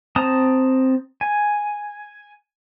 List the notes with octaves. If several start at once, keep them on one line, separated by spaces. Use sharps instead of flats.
C4 A5 A#5 D#6
G#5